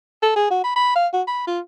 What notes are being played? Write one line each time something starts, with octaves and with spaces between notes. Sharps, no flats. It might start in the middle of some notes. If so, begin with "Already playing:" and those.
A4
G#4
F#4
B5
B5
F5
F#4
B5
F4